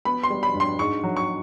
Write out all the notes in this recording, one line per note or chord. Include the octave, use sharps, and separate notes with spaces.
B3 B5
C6
G3
B5
G2
C6
G#2 C#6
F#3
C#6